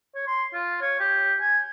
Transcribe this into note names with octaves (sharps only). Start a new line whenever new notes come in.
C#5
C6
F4
C#5
G4
G#5